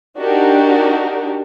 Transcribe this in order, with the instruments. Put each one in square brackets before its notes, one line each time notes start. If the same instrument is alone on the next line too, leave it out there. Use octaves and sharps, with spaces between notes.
[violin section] D4 D#4 F#4 G4 A#4